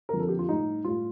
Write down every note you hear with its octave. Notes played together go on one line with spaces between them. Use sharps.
F2 D3 F3 A#4
A4
G4
F4
A2 G3 D#4
A2 G3 F4